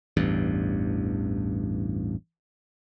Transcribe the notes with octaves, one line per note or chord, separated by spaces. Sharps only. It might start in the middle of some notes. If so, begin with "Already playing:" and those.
A1 E2 G2